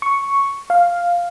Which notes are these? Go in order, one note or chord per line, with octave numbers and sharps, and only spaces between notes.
C#6
F5